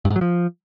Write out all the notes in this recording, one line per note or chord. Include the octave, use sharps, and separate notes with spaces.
G2
G#2
F#3
F3